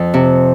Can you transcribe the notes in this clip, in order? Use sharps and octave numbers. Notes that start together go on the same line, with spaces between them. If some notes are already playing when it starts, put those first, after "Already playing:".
Already playing: F2
C3